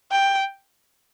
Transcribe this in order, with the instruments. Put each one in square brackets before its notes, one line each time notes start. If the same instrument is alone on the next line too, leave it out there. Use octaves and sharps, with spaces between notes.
[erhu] G5